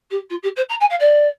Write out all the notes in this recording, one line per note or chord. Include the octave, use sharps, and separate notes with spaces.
G4
F4
G4
C5
A#5
G#5
F5
D5